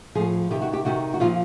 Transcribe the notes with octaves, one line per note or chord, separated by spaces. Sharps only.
A2 F3 G#4
C3 D#3 G4
F#4
G4
C3 D#3 F#4
F#4
A#2 F3 F4